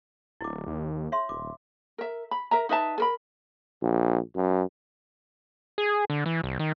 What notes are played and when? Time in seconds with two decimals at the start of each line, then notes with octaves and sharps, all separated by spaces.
0.41 D1 E4 D6
0.67 D#2
1.12 C#5 E5 C6
1.29 D#1 D6
1.98 A#4 E5
2.31 B5
2.51 A#4 E5 A#5
2.69 D#4 B4 E5 A5
2.98 A4 A#4 B5
3.82 A#1
4.36 F#2
5.78 G#4
6.10 D3
6.26 E3
6.44 C2
6.59 D#3